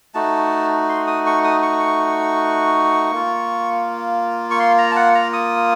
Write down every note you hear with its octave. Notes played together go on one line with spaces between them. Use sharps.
A3 D#4 F#4 A5
C6
D#6
C#6
D#6
C#6
A#3 F4
C#6
C6
A#5
A5
F#5
A#5
D#6